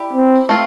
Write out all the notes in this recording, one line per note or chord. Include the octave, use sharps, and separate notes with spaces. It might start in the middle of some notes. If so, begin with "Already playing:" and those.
Already playing: E4 G4 D5
C4
A3 C4 F4